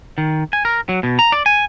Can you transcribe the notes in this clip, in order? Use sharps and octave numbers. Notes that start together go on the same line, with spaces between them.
D#3
G#5
A#4
F#3
B2
A#5
D5
G#5